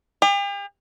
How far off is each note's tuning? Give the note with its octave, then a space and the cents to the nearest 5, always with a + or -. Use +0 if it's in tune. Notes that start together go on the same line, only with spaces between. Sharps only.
G4 +45